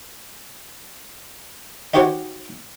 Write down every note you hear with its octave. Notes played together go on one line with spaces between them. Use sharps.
D#4 F#4 G4 C5 C#5 F#5